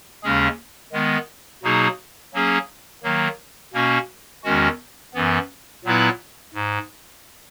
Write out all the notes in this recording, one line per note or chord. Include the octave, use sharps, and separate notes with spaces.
D#2 C#3 G#3 C#4 G#4
D#3 G#3 B3
B2 F#3 A#3 D#4 G#4
F#3 A#3 C#4 G#4
D#3 F#3 A#3
B2 A#3 C#4 F#4
E2 D#3 G#3 C#4 F#4
F#2 E3 B3
A#2 F#3 B3 E4 B4
G#2